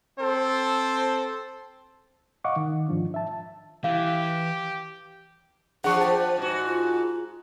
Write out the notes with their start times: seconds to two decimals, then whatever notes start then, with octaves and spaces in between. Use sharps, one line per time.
0.18 C4 A4 C5
2.44 D#5 F5 F#5 C#6 D6
2.56 D#3
2.88 G#2 F3 D4
3.14 E5 A5
3.84 E3 G4 F5
5.84 F3 D4 G#4 F#5 C#6
6.01 C5 G5 A5
6.37 G#2 F#4
6.66 F4